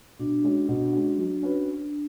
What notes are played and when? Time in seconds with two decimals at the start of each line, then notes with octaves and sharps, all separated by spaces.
0.19 B2 D4
0.44 G#3 C#4 F#4
0.68 B2
0.93 G#3 C#4 F#4
1.18 F#3
1.43 C#4 F#4 B4